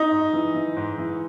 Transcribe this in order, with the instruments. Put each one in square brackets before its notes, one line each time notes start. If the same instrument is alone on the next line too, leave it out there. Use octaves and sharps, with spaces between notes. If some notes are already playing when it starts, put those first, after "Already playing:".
Already playing: [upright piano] D#4 D#5
G#2
E3
E3
G#2
E3